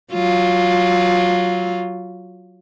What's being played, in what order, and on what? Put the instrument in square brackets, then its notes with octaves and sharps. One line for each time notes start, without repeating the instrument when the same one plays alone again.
[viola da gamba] F#3 F4